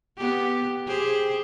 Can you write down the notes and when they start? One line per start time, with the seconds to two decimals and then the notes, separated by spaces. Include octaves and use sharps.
0.17 B3 G4
0.87 G4 G#4 C5